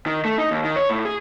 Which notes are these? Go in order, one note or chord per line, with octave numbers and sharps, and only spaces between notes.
D#3
A3
D#4
D#2
D#3
C#5
A2
G#4